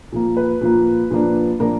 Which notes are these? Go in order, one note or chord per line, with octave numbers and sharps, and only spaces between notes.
A#2 F3 A#3
B4
A#2 F3 A#3
A#2 F3 A#3 D4
A#2 F3 A#3 D4 A#4